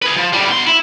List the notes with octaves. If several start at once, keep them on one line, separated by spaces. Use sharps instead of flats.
G#4 B4
F3
A2 G3
B2 C6
E4